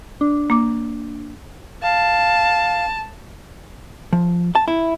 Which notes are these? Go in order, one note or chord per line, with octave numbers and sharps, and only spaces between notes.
D4
A#3 D6
F5 A5
F3
A5
E4